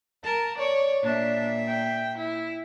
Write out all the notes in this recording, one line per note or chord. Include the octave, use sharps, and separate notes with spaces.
A#4 A5
C#5 D5
A#2 D4 E5
G5
E4